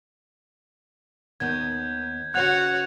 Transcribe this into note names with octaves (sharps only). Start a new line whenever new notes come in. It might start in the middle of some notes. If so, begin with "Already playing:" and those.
D#2 D#3 B3 G6 G#6
C#3 F#4 B4 C#5 F#5 F#6 G#6 F7